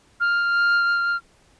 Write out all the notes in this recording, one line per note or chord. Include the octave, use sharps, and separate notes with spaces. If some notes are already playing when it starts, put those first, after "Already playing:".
F6